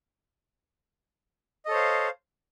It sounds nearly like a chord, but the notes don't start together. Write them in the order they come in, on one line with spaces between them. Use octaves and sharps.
D#5 A4 C#5 C5 F5